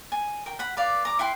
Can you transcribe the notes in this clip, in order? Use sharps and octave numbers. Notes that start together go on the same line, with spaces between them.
G#5
A#4 G5
F#5 B5
B4 D5 F5
A#5 D6
E4 B4 G5 C6